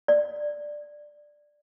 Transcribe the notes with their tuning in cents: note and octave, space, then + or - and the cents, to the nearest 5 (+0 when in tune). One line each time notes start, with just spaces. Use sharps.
D5 +5